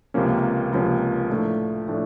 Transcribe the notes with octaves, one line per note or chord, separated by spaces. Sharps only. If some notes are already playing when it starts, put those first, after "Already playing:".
C#2 C3 F3 A#3 C#4
C#2 C3 F3 A#3 C#4
A2 F3 A3 D4
A2 F3 A3 D4